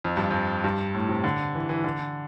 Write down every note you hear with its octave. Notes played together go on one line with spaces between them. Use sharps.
F2
G2
F2
G2
A2
C3
D3
E3
E3
D3